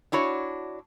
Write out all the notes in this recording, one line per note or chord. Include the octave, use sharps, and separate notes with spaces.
D4 E4 F#4 C#5